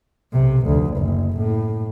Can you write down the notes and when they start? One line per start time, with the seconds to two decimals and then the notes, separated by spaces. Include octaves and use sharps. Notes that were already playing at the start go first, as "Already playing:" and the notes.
0.33 B1 C3
0.64 F1 D2
0.94 F#1 D2
1.37 A2